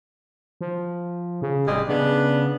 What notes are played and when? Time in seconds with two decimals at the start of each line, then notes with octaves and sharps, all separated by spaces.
0.61 F3
1.42 C#3
1.67 D1 C3 G3 G#3
1.88 C#3 B3 D4